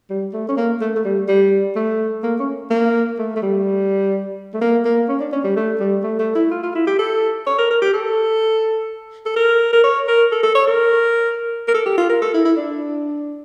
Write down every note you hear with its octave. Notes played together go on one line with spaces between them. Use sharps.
G3
A3
C#4
A#3
A3
A3
G3
G3
A3
A#3
C#4
A#3
A3
A3
G3
A3
A#3
A#3
C#4
D4
C#4
G3
A3
G3
A3
A3
E4
F4
F4
E4
G4
A4
C#5
A#4
A#4
G4
A4
A4
A#4
A#4
C#5
A#4
A4
A4
C#5
A#4
A#4
A4
G4
F4
A#4
A4
E4
E4
D4